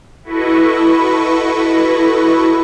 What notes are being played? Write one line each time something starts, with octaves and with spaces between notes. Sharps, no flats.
E4 F#4 A4 B4 D#5 C#6